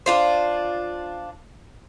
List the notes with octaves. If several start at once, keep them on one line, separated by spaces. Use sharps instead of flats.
D4 F4 C5